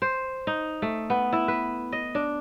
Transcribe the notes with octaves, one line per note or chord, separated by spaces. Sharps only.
C5
D#4
A3
B3
E4
B4
D#5
D4